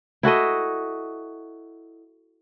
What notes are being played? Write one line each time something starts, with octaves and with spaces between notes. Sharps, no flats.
E4 F#4 A4 D#5